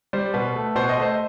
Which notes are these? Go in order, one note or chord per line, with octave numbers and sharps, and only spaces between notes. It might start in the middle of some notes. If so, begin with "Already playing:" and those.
G3 C5
B2 B4
A3
B2 C5
D#5
A3
C5